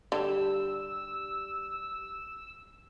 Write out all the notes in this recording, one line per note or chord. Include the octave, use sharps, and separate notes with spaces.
D3 G3 G4 E6